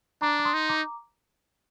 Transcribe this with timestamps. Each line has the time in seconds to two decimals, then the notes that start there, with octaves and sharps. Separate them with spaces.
0.22 D4 A#5 D6
0.39 D6
0.45 C6 D#6
0.54 D#4
0.69 A#5 D6